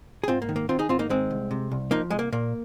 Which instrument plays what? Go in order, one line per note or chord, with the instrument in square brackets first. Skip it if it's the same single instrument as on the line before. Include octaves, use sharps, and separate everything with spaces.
[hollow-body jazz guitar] G#4
G#2 C4 F4
A#3
D#3
A#3
D#3 C4 F4
D#4 G#4
G#2 C4 F4
A#3 D#4
D#3 G#3 C4
C2
C3
C2
F3 A#3 D#4
C2 G#3
A#3
A#2 A#3